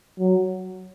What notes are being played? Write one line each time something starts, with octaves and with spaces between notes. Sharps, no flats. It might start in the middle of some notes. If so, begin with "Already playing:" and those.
F#3